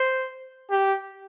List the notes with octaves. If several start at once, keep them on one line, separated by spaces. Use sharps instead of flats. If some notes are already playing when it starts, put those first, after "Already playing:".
Already playing: C5
G4